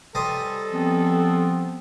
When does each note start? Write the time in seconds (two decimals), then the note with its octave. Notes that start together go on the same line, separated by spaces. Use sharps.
0.15 G3 A4 C5 D#5
0.72 F3 B3 C4